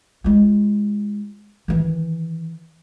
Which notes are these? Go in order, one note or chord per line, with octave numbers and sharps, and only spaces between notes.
G#3 F4
D#3 E3